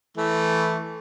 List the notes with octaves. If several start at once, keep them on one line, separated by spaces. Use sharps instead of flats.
E3 A3